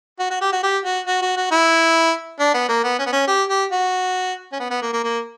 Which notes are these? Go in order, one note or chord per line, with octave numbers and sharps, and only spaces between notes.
F#4
F#4
G4
F#4
G4
F#4
F#4
F#4
F#4
E4
D4
B3
A#3
B3
C#4
B3
C#4
G4
G4
F#4
C#4
B3
B3
A#3
A#3
A#3